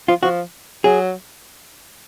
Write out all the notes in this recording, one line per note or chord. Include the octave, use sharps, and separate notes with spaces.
F3 F4
F3 F#4
F#3 G#4